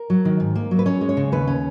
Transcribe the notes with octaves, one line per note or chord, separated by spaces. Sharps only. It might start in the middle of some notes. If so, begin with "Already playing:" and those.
Already playing: A#4
F#3
D#3
G#2
A#3
F#3
B4
C#4 C#5
G#3
C#5
C#3
D#2 B4
C#4